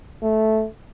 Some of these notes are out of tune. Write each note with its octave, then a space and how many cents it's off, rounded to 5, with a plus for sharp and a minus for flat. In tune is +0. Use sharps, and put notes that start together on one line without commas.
A3 -10